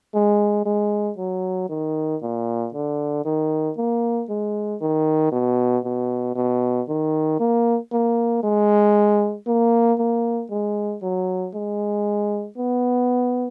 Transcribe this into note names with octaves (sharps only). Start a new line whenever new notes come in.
G#3
G#3
F#3
D#3
A#2
D3
D#3
A#3
G#3
D#3
B2
B2
B2
D#3
A#3
A#3
G#3
A#3
A#3
G#3
F#3
G#3
B3